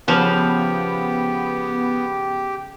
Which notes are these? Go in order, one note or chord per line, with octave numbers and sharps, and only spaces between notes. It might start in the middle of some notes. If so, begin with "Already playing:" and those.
C#3 F3 B3 G4 G5